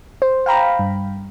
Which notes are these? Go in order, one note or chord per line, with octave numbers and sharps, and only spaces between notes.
C5
F5 G5 A#5 B5
G2